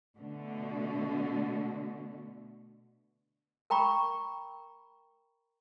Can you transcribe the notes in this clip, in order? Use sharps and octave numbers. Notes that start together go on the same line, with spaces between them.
B2 D3 A3
A#4 G5 A#5 B5 C#6